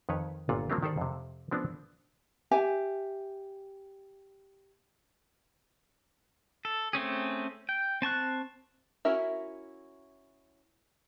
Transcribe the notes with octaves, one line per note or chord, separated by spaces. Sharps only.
F2 D#3 B4 C#5
G1 A#2 F4 F#5
F3 F#3 A#3 C4 D4 G4
D#3 G4 A4 C5 D5
F2 C3
F3 G#3 B3 C4 D4
G4 E5 G#5
A4
A3 C4 C#4 G#4
G5
C4 A5 C#6 F#6
C#4 E4 F#4 A#4 E5